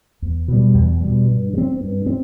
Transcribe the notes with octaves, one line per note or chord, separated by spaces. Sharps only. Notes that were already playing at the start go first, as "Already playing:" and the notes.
E2
B2 G3
E2
B2 G3
G2
F#3
C4
G2
C4